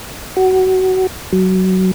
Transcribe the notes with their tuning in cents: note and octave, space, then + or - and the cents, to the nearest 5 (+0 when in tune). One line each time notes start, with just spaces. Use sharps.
F#4 +20
F#3 +15